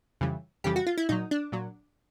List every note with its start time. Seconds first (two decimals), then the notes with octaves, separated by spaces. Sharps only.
0.21 F2 C#3 E3 G3
0.64 F2 C#3 E3 G3 G4
0.76 F#4
0.87 F4
0.97 E4
1.09 A#2 F#3 D#4
1.31 D4
1.52 A#2 F#3